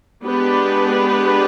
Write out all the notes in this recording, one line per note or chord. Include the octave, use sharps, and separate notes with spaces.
G#3 B3 D4 G4 B4